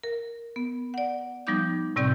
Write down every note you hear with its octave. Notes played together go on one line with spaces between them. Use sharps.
A#4
B3
D5 F#5
F3 G3 B3 D#4 D6 G6
A2 C3 G3 C4 D5 G6